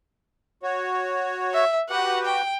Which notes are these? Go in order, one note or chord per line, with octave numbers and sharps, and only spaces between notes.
F#4 C#5
E5
F#4 G4 B4 F#5
G5